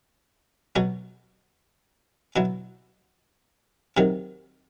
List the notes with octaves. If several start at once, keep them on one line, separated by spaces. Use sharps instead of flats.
B2 F#3 F#4
B2 F#3 E4
C3 D#3 F#3